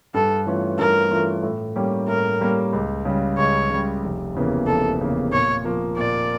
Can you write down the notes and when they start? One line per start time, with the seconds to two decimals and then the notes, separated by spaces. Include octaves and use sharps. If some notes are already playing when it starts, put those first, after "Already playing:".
0.14 G2 A4
0.46 E3 A3 C#4 F4
0.78 G2 A#4
1.11 E3 A3 C#4 F4
1.43 A2
1.76 G3 A#3 C#4 G4
2.08 A2 A#4
2.40 G3 A#3 C#4 G4
2.73 C#2
3.05 C#3 G3
3.37 C#2 C#5
3.70 C#3 G3
4.03 F1
4.35 E2 C#3 E3 A#3
4.67 F1 A4
4.99 E2 C#3 E3 A#3
5.32 A#2 C#5
5.64 F3 A#3
5.97 A#2 D5